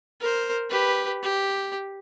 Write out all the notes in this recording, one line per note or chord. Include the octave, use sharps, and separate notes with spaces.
A#4 C5
G4 B4
G4